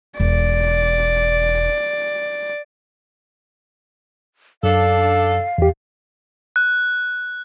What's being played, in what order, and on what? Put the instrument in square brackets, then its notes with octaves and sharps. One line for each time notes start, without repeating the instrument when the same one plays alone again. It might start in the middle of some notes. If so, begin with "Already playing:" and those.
[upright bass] E1 [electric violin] D5
[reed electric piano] F#2 [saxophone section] D4 A4 [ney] F5
[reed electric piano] E2 G4
[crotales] F#6